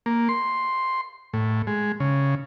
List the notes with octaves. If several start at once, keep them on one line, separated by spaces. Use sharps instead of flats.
A#3
C6
A2
G#3
C#3